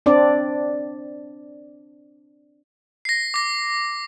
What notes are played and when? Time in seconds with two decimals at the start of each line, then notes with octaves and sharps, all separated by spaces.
0.06 C4 D4 D5
3.05 A#6 C7
3.34 D6 A#6